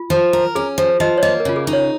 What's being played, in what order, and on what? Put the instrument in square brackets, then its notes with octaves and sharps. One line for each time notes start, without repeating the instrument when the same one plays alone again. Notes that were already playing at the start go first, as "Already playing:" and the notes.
Already playing: [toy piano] F4
[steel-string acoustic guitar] F3
A#4
[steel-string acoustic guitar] C#4 [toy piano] G#4
[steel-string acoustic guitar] F3
[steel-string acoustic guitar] F3 [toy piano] D#5
[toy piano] C#5
[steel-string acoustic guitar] A#3 [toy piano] D#5
[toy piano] A#4
[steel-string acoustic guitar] C#3 [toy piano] F4
[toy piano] G#4
[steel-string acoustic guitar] D#4
[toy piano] C#5